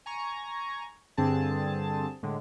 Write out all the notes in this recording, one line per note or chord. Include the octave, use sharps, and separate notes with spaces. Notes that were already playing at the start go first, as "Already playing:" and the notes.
G#5 A#5 C#6
G2 D3 C4 G#4 A5
A2 D3 G#3